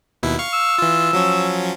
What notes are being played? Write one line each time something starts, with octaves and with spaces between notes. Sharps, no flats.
D#2 B2 E4
F5 C#6
E6
E3 F4
F3 F#3 C#4